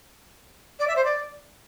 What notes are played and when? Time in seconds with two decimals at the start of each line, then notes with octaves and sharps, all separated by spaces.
0.79 D5
0.88 E5
0.96 C5
1.04 D5